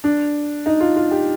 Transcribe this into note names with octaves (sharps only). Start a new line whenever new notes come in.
D4
D#4
F4
F4
G4